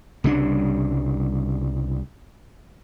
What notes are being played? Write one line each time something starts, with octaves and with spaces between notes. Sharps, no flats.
C2 C#3 G3 D4